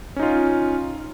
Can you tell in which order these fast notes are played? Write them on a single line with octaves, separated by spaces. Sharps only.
C#4 D#4 F4